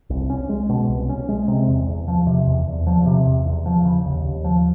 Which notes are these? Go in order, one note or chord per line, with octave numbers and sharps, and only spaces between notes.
C2
C#4
G#3
B2
C2
C#4
G#3
C3
E2
E2
F3
C3
E2
E2
F3
C3
E2
E2
F3
C#3
D#2
D#2
F3